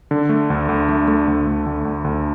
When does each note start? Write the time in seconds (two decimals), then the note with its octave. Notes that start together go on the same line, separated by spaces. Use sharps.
0.11 D3
0.29 A3
0.50 D2
0.69 D2
0.89 A3
1.08 A3
1.28 D2
1.47 D2
1.66 D2
1.85 D2
2.04 D2